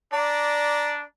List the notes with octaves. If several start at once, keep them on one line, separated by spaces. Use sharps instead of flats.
D4 D5 A#5